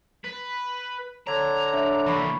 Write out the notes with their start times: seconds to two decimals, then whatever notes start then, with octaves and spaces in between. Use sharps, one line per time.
0.24 B4
1.27 D3 C#5 A#5 G#6
1.74 D4 C#5 E5
2.06 E3 A#3 B5 C#6